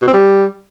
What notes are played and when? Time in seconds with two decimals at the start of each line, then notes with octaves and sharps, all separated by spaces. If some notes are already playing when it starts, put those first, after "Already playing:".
0.02 B2
0.08 C4
0.13 G3